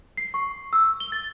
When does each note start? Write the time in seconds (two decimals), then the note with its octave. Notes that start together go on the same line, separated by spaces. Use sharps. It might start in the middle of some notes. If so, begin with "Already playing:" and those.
0.17 C7
0.34 C#6
0.73 E6
1.00 G7
1.12 A6